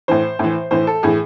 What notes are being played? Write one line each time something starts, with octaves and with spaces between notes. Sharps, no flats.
A2 E3 C5
A2 E3
A2 E3 C5
A4
A2 E3 G#4